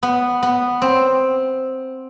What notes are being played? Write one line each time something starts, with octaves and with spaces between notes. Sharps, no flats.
B3
B3
C4